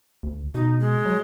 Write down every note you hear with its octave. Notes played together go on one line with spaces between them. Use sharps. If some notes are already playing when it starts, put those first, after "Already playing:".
D2
B2 D#4
G#3
F#3